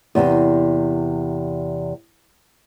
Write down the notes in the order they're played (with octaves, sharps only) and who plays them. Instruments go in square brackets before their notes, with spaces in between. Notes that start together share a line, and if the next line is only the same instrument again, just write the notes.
[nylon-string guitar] E2 C3